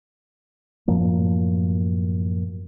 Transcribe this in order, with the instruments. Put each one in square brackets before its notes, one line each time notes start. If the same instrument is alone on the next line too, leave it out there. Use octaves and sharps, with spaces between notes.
[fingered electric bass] F#2 A2 F3 A#3